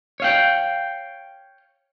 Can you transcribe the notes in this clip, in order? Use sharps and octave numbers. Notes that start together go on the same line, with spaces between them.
C#5 F5 G5